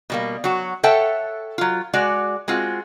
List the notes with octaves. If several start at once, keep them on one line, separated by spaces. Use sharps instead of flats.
B2 G3 A#3
F#3 F#4
A4 C#5 E5 F#5 G5 A5
F#3 F4
G#3 F#4 D5
G#3 C4 F4 F#4